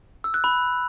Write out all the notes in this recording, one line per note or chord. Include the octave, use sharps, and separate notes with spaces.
E6
F#6
B5